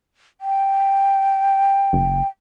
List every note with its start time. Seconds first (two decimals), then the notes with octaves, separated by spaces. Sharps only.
0.41 G5
1.93 F#1